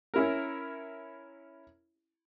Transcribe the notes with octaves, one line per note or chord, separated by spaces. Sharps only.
C#4 E4 A#4